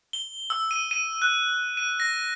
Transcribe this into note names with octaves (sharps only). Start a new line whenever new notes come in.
G7
E6
D#7
D#7
F#6
D#7
A#6